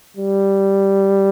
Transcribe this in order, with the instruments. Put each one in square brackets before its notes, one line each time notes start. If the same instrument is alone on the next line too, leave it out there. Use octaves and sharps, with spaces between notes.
[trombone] G3